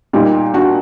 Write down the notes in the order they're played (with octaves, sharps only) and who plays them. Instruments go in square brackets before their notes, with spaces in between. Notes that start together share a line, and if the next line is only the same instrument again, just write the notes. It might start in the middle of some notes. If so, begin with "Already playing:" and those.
[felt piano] A#2 G3 D#4 G4
D4 F#4